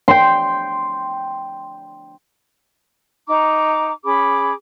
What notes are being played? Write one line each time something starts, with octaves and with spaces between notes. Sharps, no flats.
G5 C6
D#4 A#5 D6
C#4 G#4 B5 D6